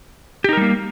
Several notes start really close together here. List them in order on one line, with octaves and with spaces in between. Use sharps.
G4 D#4 A#4 G3 A#3